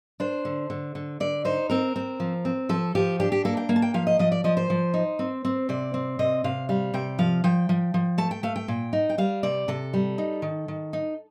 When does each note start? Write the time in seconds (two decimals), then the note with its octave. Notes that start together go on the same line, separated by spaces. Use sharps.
0.20 D4 C5
0.45 D3
0.70 D3
0.95 D3
1.20 D3 D5
1.45 D#4 C5
1.70 C4 A#4
1.96 C4
2.20 F3
2.45 C4
2.69 F3 A4
2.95 F3 G4
3.20 D4 G4
3.32 G4
3.45 A#3 A4
3.57 G5
3.69 A#3
3.76 A5
3.82 G5
3.94 F3 F5
4.07 D#5
4.19 F3 D#5
4.32 D5
4.44 F3 D#5
4.57 C5
4.70 F3
4.94 D#4
5.19 C4
5.45 C4
5.69 C3 D5
5.94 C4
6.19 C3 D#5
6.44 C3 F5
6.69 G3 F5
6.94 C3 G5
7.19 F3 F5
7.44 F3 G5
7.69 F3
7.94 F3
8.18 A3 A5
8.31 G5
8.43 A3 F5
8.56 G5
8.68 A#2
8.93 D#4
9.09 G5
9.18 G3 F5
9.43 C3 D5
9.68 C3 A4
9.93 G3
10.18 D#4
10.42 D#3
10.68 D#3
10.93 D#4